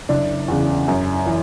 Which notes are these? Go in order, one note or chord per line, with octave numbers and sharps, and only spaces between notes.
F#1 D4
E2 C#3
F#2
E3